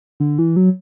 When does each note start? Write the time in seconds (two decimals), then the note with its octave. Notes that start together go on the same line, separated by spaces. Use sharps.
0.20 D3
0.39 E3
0.56 F#3